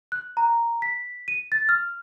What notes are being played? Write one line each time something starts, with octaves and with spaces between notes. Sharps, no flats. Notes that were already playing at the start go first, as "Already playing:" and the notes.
F#6
A#5
B6
D#7
A6
F6